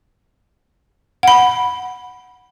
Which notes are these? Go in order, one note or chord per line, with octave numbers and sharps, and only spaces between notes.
F#5 B5